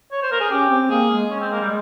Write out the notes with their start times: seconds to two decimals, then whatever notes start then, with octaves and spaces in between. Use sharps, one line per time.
0.12 C#5
0.22 C5
0.32 A#4
0.41 G#4
0.49 C#4 G4
0.70 C4
0.90 A#3 G#4
1.10 G#3
1.30 C#4
1.41 C4
1.52 A#3
1.61 G3